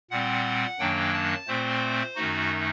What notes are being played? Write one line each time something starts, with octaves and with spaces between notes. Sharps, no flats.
A#2 G3 C4 F#5
F#2 D#3 F#3 A#3 D4 G5
A5
A#2 A3 C4 C5
F#2 D#3 A3 D#4 F#4